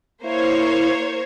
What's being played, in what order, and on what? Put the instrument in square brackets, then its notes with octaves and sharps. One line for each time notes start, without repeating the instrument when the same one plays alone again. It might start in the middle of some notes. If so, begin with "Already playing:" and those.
[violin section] A#3 C5 C#5 [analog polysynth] E4